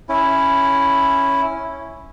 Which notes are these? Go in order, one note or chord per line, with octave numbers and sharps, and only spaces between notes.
C#4 E4